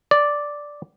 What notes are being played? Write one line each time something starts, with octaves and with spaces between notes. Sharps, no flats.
D5